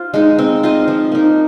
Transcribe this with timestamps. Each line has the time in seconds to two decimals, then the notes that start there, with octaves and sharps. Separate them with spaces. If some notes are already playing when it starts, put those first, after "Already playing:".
Already playing: F4 C5
0.14 G#3 D#4
0.39 C4
0.63 F4 C5 D#5
0.88 F3
1.12 A#3 D#4